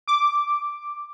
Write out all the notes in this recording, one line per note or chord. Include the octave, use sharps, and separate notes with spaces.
D6